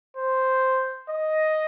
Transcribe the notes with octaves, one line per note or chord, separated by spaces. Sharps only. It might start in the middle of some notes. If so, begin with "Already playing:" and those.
C5
D#5